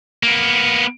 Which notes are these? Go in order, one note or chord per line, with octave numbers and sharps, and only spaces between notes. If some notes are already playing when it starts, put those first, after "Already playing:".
A#3 B3